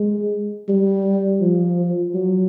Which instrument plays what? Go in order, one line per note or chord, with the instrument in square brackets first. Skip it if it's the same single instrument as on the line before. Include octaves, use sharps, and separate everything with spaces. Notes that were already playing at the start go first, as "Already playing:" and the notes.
Already playing: [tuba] G#3
G3
F3
F#3